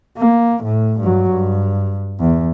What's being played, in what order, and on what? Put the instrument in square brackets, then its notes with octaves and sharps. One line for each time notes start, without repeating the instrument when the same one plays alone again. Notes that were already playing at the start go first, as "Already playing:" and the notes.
[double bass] A#3
A2
G2 F#3
G2
E2